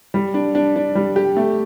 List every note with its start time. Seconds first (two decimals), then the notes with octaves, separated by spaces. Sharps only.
0.14 G3
0.34 D4
0.55 D4
0.76 D4
0.95 G3
1.16 G4
1.37 A3